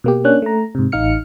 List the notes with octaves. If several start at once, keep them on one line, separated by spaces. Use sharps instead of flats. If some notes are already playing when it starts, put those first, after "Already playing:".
B2 A#3 G4
A#3 C#4 D4 F#6
A3 A#5
G#2 C3
A1 D#4 F5 F6 C#7